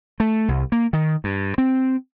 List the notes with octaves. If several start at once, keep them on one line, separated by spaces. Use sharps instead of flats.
A3
C2
A#3
D#3
G2
C4